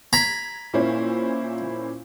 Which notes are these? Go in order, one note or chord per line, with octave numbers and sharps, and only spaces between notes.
A#5 B5 G#6
A#2 A#3 C#4 E4 C5